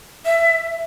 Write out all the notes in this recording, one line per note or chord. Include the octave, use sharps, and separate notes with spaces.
E5